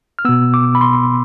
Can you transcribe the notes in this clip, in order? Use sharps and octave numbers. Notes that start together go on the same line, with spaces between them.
F6
B2 B3 E6
D6
B5
C6